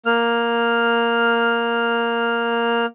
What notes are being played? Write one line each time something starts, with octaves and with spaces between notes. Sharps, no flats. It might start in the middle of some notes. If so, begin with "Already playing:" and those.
A#3 F6